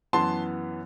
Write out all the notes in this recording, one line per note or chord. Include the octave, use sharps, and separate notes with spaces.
F#2 E3 B3 A5 C6